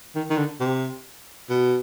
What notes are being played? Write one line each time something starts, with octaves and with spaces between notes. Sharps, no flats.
D#3
D#3
D3
C3
B2